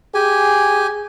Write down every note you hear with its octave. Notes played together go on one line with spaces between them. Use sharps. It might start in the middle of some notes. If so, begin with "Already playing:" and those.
G4 G#4 G#5